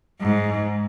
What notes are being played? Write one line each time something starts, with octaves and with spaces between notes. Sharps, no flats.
G#2